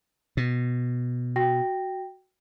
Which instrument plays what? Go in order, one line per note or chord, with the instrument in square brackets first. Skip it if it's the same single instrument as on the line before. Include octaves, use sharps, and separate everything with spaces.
[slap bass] B2
[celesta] F#4 G5 A#6